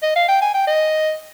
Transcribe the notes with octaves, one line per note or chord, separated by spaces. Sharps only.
D#5
F5
G5
G#5
G5
D#5